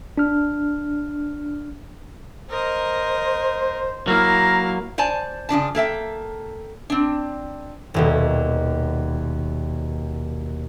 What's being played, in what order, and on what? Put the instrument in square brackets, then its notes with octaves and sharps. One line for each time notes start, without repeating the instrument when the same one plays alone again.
[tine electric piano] D4 F6
[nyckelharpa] A#4 D#5 [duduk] C5
[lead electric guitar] F#3 A#3 [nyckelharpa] E4 F5 [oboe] A#4
[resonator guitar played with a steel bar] C5 D5 G#5 A5
C#3 F3 D4 A5
A#3 A4 E5 G5
C4 D4
[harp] D#1 D#2 B2